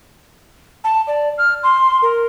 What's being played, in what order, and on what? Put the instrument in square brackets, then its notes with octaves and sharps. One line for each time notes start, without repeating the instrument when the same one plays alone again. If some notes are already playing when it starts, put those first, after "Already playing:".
[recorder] A5
D5
F6
C6
A#4